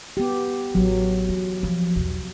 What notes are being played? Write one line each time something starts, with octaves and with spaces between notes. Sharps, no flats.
B3 G4
A1 F#3
E3
F3
B1 E2